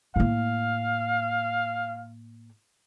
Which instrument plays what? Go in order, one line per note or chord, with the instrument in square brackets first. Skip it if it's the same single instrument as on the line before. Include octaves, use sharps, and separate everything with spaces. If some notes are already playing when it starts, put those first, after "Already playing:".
[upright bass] A2 A#3 [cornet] F5